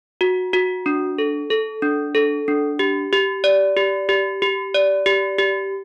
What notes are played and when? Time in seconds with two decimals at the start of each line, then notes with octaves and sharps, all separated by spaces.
0.21 F#4
0.53 F#4
0.86 D4
1.18 A4
1.50 A4
1.82 D4
2.15 A4
2.48 D4
2.79 G4
3.13 G4
3.44 D5
3.77 G4
4.09 G4
4.42 G4
4.74 D5
5.06 G4
5.38 G4